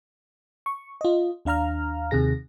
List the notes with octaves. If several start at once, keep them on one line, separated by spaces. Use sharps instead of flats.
C#6
F4 D#5
D#2 D4 F5 A#5 F6
D#2 C3 D#3 G#4 A#6